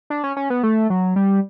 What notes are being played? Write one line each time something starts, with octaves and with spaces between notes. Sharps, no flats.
D4
C#4
C#4
B3
A3
F#3
G3